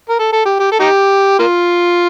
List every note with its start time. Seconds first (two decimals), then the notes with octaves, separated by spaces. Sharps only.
0.09 A#4
0.19 A4
0.32 A4
0.45 G4
0.59 G4
0.71 A4
0.80 D#4 G4
1.39 A#3 F4